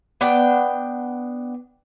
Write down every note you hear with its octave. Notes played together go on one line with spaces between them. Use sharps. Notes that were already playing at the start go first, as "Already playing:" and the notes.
B3 D4 G5